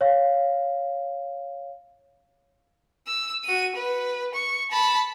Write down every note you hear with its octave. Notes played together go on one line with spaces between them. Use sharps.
C#5 F5
E6
F#4 D#7
B4
C#6
A5 B5